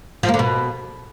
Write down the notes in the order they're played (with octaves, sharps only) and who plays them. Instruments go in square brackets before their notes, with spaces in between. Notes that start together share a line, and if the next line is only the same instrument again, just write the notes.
[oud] F3
A#3
D3
B2